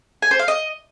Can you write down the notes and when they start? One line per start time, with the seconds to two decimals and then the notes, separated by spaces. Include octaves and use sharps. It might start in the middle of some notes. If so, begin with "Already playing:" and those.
0.22 G#5
0.31 C5
0.39 F5
0.48 D#5